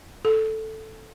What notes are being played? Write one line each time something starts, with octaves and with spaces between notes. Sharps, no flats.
A4